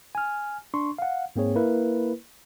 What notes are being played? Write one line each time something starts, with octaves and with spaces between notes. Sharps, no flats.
G#5 F6
D4 C6 C#6
F5 F#5
G#2 A#3 C4 G#4 C#5
A#3 E4 A#4 B4